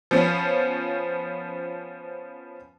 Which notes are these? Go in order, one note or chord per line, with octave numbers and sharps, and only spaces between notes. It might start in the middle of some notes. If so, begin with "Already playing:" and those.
F3 B3 C#4